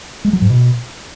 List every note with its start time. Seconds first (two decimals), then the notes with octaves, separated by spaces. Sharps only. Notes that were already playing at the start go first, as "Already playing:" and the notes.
0.24 G#3
0.33 F#3
0.42 G#2
0.50 B2